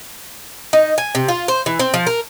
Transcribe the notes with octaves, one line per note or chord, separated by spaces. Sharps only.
D#4
G#5
C3
F4
C5
E3
C4
F3
A#4